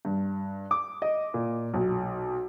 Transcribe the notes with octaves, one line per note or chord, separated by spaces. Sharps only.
G2
D6
D#5
A#2
B1